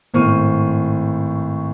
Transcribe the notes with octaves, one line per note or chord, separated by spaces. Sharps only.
G#1 A2 C5 C#6 F6 D#7